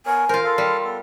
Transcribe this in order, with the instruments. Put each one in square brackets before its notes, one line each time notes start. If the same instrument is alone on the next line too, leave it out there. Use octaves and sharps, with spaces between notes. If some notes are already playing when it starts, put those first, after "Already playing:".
[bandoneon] B3 A#4 C#5 [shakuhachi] G#5
[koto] F4 A#4 [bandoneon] C5
[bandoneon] A4 F5 [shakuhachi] C6
[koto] G3
[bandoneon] B3 A4